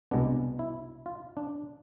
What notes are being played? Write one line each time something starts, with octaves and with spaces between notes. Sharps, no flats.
C2 B2 G#3 B3 D4
E4
F4
D4